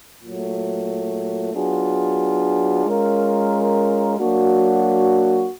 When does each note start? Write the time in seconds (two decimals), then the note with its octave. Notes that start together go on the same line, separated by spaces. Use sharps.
0.22 A#2 F#3 A3
1.54 F#3 B3 D4 F4 G#4
2.86 G#3 C#4 F4 A#4
4.18 F#3 A#3 D4 F#4